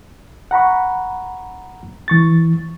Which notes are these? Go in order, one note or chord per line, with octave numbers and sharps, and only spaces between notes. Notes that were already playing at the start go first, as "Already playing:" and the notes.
F#5 A#5 B5 C#6
E3 C#6 A6